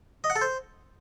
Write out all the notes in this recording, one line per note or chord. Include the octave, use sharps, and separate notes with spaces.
D#5
F#5
A4
C5